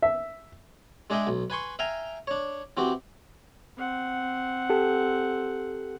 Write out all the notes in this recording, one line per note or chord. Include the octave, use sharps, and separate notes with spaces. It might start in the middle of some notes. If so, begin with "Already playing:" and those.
E5
G#3 D4 G#4 D#5 E5 G5
B1
B4 G#5 C6 C#6
E5 F5 G5 G#5 A#5
D4 C#5
E3 C4 F#4 G4
C4 F#5
G4 A4